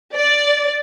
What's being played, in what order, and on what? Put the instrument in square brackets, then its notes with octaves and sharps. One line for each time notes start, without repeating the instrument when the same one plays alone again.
[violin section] D5